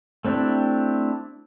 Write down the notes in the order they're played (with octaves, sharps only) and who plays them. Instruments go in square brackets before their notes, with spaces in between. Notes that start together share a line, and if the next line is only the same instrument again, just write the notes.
[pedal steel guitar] A3 C4 D4 E4 G4